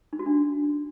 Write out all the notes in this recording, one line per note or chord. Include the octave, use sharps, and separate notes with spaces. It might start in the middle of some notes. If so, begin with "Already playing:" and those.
D#4
F#4
D4